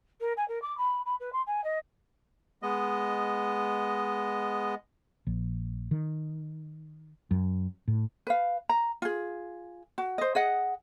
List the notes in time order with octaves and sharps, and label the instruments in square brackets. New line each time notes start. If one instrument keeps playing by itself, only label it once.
[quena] A#4
G#5
A#4
D6
B5
B5
B4
C6
G#5
D#5
[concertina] G#3 B3 D#5
[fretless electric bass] A#1
D#3
F#2
A2
[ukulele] B4 F5
A#5
F4 G#4
F#4
C5 D#5
G#4 D#5 F#5